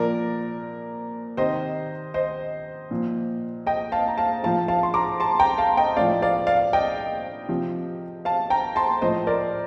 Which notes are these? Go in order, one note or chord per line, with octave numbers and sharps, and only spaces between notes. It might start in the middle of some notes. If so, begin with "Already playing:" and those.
Already playing: A#2 F3 A#4 D5
C3 D#3 C5 D#5
C5 D#5
A#2 F3
D#5 G5
F5 A5
A#5
F5 A5
A2 F3 F5 A5
F5 A5
C6
A#5 D6
A5 C6
G5 A#5
F5 A5
D#5 G5
A2 F3 D5 F5
D5 F5
D5 F5
D#5 G5
C3 F3
F5 A5
G5 A#5
A5 C6
A2 F3 C5 D#5
A#4 D5